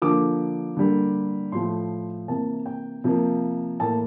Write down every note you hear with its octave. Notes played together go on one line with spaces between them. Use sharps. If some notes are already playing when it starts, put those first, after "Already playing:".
D3 F3 A#3 D6
D3 G3 A#3
A2 F3 A3 C6
C3 E3 A#3 A5
G5
C3 F3 A#3
A2 E3 A#3 A5